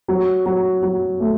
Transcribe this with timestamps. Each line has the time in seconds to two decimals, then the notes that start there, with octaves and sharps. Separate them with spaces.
0.08 F#3
0.46 F#3
0.83 F#3
1.20 A3